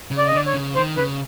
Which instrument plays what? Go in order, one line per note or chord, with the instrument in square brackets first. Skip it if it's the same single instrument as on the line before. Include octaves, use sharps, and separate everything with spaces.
[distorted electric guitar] C#3
[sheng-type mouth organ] D5
D#5
[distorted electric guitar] D3 [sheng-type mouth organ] D5
[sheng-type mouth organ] C#5
[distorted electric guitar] C#3
[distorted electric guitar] D#3 [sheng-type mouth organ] C5
[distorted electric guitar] C#3 [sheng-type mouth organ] B4